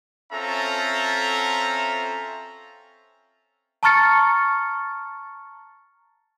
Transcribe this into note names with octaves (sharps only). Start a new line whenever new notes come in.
C4 C#4 F4 A4 E5 A#5
A5 A#5 C#6 F6 A6 C#7